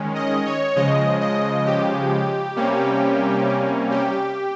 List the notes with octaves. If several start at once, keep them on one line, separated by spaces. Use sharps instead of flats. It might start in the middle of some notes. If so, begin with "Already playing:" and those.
Already playing: D#3 G#3 C#4
D#5
C#5
C#3 F3 G#3 D#5
D#5
G4
C3 G3 A#3 C#4
G4